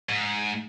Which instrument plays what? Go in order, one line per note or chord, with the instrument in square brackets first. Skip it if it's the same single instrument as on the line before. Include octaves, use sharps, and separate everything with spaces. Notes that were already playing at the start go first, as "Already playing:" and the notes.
[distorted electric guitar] G#2